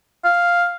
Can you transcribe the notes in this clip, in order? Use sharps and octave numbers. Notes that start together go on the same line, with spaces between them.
F5